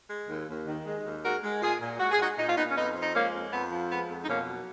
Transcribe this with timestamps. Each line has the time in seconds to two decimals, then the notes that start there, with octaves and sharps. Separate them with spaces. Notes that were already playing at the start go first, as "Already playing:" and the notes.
0.09 G#3
0.29 D#2
0.48 D#2
0.67 D#3
0.86 G#3
1.05 D#2
1.24 G#3 F#4 A#4
1.43 G#3
1.62 A#2 F4 G#4
1.80 A#2
2.00 G#3 F#4
2.11 G#4
2.19 G#3 D#4 F#4
2.38 A#2 D#4
2.47 F4
2.57 A#2 B3 D#4
2.70 C#4
2.76 F2 B3 D#4
2.96 F3
3.02 D#4
3.14 G#3 A#3 C#4
3.33 F2
3.52 F2 B3
3.71 F3
3.90 G#3 B3
4.09 F2
4.24 D#4
4.28 B2 A#3 C#4
4.47 F#3